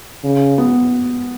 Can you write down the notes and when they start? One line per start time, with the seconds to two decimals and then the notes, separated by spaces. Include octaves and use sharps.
0.24 C#3
0.58 B3